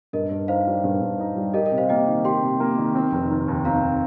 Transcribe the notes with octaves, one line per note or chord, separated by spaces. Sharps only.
G2 A#4 D#5
G2
D#4 C5 F5
G3
G2
G2
D#4
G3
G4 A#4 D#5
A#4 D#5
C3
C5 F5
A#3 D#5 G5
D#3
G4 G5 C6
C3
A#3
D#3
C4
F1
D#3
D#2
C4 F5 A#5